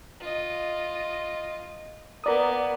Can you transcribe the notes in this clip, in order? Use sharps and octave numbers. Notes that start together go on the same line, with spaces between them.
F4 D#5
A#3 B3 A#4 D5 D#6